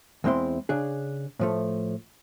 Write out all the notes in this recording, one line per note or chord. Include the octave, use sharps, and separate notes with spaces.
E2 G#3 C4 E4 C6
C#3 D4 G#4
A2 F3 A3